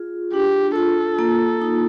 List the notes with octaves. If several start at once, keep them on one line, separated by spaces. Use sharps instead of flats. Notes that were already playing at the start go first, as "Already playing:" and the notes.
Already playing: F4 G#4
D4 G4
F4 A4
A#3
D#4